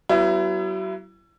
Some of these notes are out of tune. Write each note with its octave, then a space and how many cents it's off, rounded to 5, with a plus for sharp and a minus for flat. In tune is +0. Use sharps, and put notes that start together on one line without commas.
F#3 +40 B3 +0 E4 +30